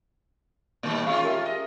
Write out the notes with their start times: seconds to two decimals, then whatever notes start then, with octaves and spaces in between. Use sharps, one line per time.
0.83 A#2 D#3 G3 A#3 D5
1.06 G#3 C#4 F4 F5
1.24 G4 A#4 E5
1.45 D#5